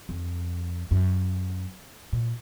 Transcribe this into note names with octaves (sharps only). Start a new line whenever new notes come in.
F2
F#2
A#2